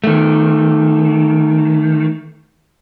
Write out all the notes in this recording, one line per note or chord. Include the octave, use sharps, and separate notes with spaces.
D#3 A3